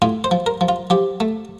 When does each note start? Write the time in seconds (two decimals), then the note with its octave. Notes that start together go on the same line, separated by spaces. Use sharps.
0.02 A2 F4
0.24 C5
0.31 F3
0.46 A#4
0.61 F3
0.69 F4
0.90 F3 G4
1.20 A3